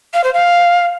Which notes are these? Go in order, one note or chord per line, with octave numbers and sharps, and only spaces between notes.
F5
C5
F5